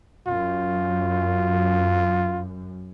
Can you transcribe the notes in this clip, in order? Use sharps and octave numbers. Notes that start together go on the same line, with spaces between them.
F#2 F4